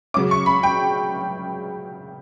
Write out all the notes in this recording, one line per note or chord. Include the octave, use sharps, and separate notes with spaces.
C#3 F#3 C#4 D6
C#6
B5
G5